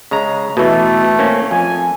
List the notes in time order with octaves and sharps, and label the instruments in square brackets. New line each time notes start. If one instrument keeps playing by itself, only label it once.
[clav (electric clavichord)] C#3 G#3 A#5
[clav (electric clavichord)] B2 E3 [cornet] A3
[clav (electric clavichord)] A#3 C4 C#4
[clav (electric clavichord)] F2 [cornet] G#5